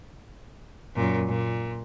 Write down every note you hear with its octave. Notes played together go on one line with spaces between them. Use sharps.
F#2 A#2
A#2